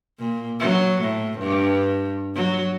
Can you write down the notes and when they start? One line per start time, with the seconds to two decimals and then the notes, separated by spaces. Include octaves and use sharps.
0.19 A#2
0.60 F#3
1.01 A2
1.38 G2
2.35 F#3